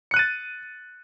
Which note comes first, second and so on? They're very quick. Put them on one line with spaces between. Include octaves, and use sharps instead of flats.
C#7 F#6 D#7 A6